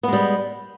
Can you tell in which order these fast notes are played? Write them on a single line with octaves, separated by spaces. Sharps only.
B3 G#3 G3